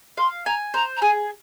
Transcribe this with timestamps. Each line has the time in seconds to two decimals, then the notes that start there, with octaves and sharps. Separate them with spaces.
0.17 F5 C6
0.45 G#5 A#5
0.74 C5 A#5
0.96 A#5
1.01 G#4 G#5